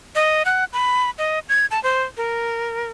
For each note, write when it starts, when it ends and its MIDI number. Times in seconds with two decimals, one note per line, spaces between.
0.15 0.43 75
0.45 0.64 78
0.73 1.10 83
1.18 1.39 75
1.49 1.66 92
1.71 1.82 81
1.84 2.04 72
2.17 2.89 70